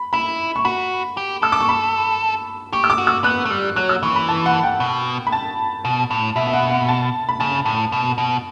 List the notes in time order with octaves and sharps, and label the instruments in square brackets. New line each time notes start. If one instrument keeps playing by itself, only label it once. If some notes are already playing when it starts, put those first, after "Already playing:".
Already playing: [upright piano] B5
[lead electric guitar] E4 [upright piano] B5
[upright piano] C#6
[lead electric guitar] F#4 [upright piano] B5
[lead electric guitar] G4
[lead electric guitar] A4 [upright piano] E6
[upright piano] D6
C#6
B5
[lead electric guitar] G4 [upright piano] C#6
[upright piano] E6
D6
[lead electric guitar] F#4
[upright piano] E6
[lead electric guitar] B3 [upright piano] F#6
[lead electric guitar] A3
G3
[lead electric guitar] F#3 [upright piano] F#6
[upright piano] E6
[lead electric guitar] E3 [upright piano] C#6
[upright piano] B5
A5
F#5
G5
[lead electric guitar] B2
[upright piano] B5
A5
[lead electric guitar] B2
A2
[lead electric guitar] B2 [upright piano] E5
[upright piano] E5
F#5
F#5
A5
B5
[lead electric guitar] C#3 [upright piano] A5
[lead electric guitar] A2
B2
B2